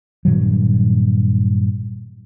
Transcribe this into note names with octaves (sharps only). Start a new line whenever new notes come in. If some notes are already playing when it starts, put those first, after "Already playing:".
G2 A#2 D#3 F#3